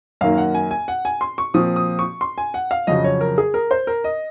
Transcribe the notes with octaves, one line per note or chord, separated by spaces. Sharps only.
F#2 D#3 A#3 F5
F#5
G#5
G#5
F#5
G#5
C6
C#6
A#2 F3 C4 D#6
D#6
C#6
C6
G#5
F#5
F5
F2 C#3 F#3 D#5
C#5
A#4
G#4
A#4
C5
A#4
D#5